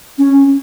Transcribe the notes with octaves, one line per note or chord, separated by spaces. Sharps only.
C#4